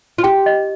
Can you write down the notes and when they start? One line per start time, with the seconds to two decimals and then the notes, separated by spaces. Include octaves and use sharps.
0.18 F4
0.24 G4 G5
0.46 D#5